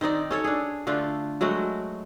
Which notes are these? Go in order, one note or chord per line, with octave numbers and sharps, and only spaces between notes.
D#3 C4 D#4 D5
C#4 A4 C#5
D4 G#4
D3 A3 D4 F4
F#3 G#3 A3 F#4